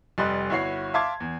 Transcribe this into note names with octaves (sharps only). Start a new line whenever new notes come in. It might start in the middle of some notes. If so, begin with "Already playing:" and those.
F1 G3 D#5 C6 F#6
G1 E4 F#4 C#5 C7
E5 F5 A5 C6 D6 G#6
E2